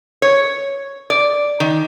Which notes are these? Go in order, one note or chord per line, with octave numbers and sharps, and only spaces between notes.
C#5
D5
D#3